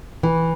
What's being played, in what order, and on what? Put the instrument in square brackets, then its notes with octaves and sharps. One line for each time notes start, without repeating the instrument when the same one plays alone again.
[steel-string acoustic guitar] E3